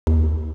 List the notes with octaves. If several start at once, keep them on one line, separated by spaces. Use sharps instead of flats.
D#2